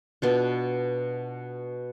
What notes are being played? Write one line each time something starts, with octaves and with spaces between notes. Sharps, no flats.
B2 D4 F4